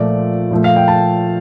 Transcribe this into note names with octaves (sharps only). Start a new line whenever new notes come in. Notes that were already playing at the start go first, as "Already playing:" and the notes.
Already playing: A#2 F3 A3 D5
A#2 F3 A3
F5
G5
A5